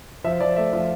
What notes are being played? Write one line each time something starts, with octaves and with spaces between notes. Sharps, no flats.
F3 E5
F3 D5
A3 E5
F3